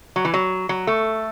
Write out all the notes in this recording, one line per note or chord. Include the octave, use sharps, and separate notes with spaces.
F#3
E3
F#3
F#3
A3